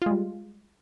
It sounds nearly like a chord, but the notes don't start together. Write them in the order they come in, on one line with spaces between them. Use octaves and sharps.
F4 G#3 G3